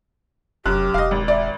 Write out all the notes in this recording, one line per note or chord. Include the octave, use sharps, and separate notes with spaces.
F1 F#2 G4 F#6
E1 D#5 F5
G#1
D5 E5